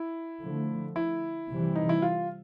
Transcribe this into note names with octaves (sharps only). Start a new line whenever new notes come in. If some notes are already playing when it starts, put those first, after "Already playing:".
Already playing: E4
D3 F3 A3
E4
C3 E3 G3
D#4
E4
F4